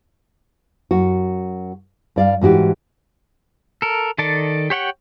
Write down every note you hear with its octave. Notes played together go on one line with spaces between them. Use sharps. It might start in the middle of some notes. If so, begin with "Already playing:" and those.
F#2 F#4
G2 D5 F5
G#2 E3 F#4 G4
A4 A#4
D#3 A4 D5 A5
G4 C#5 F#5 G5